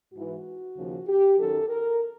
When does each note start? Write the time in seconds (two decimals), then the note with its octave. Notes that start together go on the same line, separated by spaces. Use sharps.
0.14 G#2 E3 F#4
0.77 D#2 C#3 F3
1.08 G4
1.39 F#2 D#3 A4
1.69 A#4